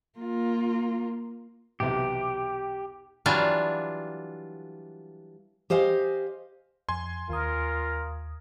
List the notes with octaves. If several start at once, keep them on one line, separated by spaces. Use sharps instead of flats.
A#3 F4
B1 E2 C3 G4
E3 F#3 G3 D4 F4
G4 C5 D#5 F5 G#5
F2 G#5 C6 G#6
D#2 F4 A#4 D#6